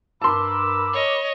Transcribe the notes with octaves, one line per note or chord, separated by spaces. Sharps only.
G2 A#4 A5 B5 C6 D6 E6
C#5 D#5